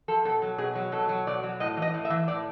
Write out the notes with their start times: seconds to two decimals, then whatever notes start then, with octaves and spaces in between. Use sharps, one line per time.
0.08 F3 A4
0.25 B2 A4
0.42 F#3
0.58 B2 G#4
0.75 F#3
0.92 B2 A4
1.09 F#3
1.27 B2 D5
1.43 F#3
1.60 A2 D#5
1.77 E3
1.82 D#5
1.94 A2
2.05 E5
2.10 E3
2.28 A2 D5